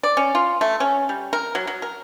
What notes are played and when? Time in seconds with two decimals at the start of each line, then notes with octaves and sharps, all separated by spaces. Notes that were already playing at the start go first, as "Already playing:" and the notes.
0.03 D5
0.17 C#4
0.35 F4
0.61 A3
0.80 C#4
1.09 G3
1.33 A#4
1.55 F#3
1.67 F#3
1.82 A#4